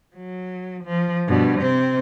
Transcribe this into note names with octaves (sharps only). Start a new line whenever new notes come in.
F#3
F3
G2 B2
C3 C4